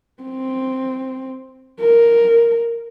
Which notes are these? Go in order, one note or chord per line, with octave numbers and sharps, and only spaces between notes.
C4
A#4